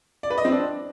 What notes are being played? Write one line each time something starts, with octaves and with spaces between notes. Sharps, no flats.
D5
B4
D#5
C4
D4